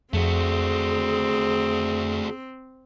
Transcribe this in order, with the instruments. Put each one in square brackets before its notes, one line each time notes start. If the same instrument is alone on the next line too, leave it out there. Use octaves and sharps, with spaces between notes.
[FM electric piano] F2 [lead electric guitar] A3 F#4 [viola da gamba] C4 [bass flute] G#4